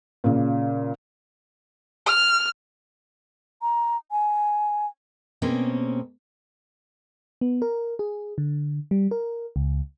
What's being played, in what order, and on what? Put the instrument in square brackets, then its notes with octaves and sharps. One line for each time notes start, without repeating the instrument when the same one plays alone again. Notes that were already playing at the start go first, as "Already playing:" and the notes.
[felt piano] A#2 C#3
[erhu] F6
[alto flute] A#5
G#5
[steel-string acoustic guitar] B2 A#3 C4 C#4 G4 G#4
[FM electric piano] B3
A#4
G#4
D3
G3
A#4
C#2